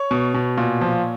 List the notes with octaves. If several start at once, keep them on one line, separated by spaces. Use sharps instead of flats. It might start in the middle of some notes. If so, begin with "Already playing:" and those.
Already playing: C#5
B2
B2
A#2
F3